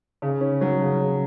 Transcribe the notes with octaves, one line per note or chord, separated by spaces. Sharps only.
C#3
C#4
F#3
C#3
C#3